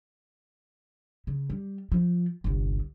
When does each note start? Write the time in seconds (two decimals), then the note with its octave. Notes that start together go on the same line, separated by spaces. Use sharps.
1.27 C#3
1.50 G3
1.92 F3
2.44 G1 C2